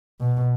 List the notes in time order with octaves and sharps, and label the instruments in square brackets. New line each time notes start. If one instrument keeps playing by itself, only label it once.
[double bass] B2